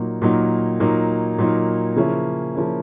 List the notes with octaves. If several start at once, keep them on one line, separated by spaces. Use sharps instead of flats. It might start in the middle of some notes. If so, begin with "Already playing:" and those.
Already playing: A#2 F#3 A#3 D#4
A#2 F#3 A#3 D#4
A#2 F#3 A#3 D#4
A#2 F#3 A#3 D#4
C#3 F3 A#3 C#4 E4
C#3 F3 A#3 C#4 E4